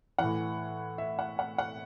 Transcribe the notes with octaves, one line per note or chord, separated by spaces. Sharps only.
A2 E3 F#5
E5
F#5
F#5
F#5